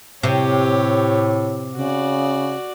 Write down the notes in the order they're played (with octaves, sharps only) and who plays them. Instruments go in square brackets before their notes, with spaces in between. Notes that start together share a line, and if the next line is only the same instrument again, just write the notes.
[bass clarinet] A2 [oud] C3 [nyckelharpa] G4 C#5
[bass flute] C#3 [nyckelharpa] F#4 D5